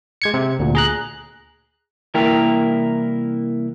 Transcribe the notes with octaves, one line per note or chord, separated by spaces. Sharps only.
G#3 G#6 C#7
C3
D2 A#2
G#4 A#5 F#6
C2 E3 A#3 E4 A#4 G5